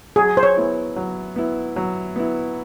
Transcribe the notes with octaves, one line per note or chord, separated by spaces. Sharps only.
F#3 G#4
C5
C#5
B3 E4
F#3
B3 E4
F#3
B3 E4